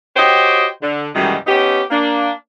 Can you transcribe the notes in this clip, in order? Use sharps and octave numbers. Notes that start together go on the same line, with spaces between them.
F#4 G4 C5 C#5 D#5 G5
D3
F#2 B2 D#3 E3 G3 G#3
B3 C#4 D#4 G4
A#3 D4